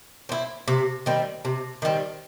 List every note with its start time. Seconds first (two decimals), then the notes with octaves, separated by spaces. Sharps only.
0.29 C4 E4
0.68 C3
1.06 D#3 G3 C4
1.45 C3
1.82 D#3 G3 C4